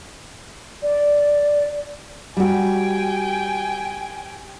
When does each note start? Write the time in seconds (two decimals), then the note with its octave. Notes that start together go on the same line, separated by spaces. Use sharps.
0.83 D5
2.37 G3 F#4 G5 G#5